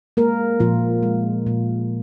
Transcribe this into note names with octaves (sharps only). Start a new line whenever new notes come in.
G#3 A#3 A#4
A#2 F3 F4
G#3
A#2